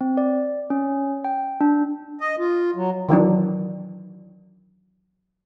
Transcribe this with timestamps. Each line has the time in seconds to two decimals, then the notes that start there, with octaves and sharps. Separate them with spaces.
0.01 C4
0.17 D5
0.70 C#4
1.24 G5
1.61 D4
2.21 D#5
2.39 F4
2.76 F#3
3.09 D#3 E3 F#3 D4